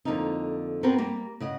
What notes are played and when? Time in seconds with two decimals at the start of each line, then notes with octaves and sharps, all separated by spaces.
0.05 F2 D3 A#3 D4 D#4
0.83 B3 C4 D4 F#4 A#4 B4
0.98 G3 A#3
1.40 C#3 D#5 F#5